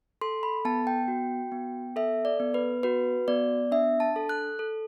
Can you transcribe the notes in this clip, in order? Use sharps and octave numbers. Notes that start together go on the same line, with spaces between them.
A4 C6
B5
B3 A5
G5
F#4
B3
A4 E5
D5
B3
B4
F#4 B4
B3 D5
D4 E5
A5
A4
F#6
A4